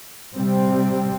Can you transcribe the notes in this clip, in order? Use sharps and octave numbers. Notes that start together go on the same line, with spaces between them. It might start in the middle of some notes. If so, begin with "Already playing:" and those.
C3 G3 C4